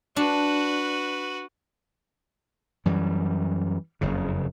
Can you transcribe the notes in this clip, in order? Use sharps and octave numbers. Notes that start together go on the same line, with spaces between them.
D4 F#4 B4
F#2 E3 G3
F#1 F2 C#3